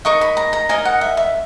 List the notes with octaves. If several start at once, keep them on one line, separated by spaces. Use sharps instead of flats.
D#4 A#4 D#5 C#6
B5
A#5
A#5
D#4 A#4 D#5 G#5
F#5
E5
E5